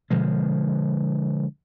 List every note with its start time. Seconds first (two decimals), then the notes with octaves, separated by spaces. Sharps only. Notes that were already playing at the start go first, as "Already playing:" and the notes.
0.10 B2 D3 F3 G#3